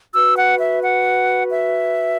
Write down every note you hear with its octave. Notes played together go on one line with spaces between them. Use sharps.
F#4 B4 E6
F#5
E5
F#5
E5